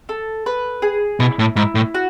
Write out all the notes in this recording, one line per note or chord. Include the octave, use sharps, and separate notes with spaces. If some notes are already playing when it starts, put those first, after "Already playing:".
A4
B4
G#4
B2 E4
A2
G#2 E4
A2
F#4